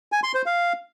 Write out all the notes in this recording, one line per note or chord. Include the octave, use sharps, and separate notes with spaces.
G#5
C6
C5
F5